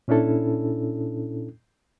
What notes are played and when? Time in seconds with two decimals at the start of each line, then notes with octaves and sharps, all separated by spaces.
0.08 A#2 C#4 D4 E4 A4